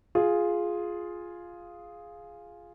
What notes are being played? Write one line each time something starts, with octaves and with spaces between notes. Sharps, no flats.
F4 G#4